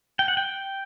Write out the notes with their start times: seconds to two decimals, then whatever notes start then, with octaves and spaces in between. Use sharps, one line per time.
0.19 G5
0.28 F#5
0.37 G5